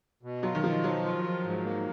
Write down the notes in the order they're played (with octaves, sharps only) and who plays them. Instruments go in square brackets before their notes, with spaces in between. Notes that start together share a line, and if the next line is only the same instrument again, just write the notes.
[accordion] B2
[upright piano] F#3 [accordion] F4
[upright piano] D#3
[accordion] B2 [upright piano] F3
[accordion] F3 [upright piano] F#3
[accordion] F4
F3
G#2
A#3